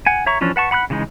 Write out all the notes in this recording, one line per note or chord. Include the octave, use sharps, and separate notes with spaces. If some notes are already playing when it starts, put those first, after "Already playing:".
F#5 G#5
C#5 E5 A#5 C#6
E3 F3 C#4 D4
B4 F#5 A5 C#6
F#5 B5 D6 F#6
C#3 E3 G#3 D#4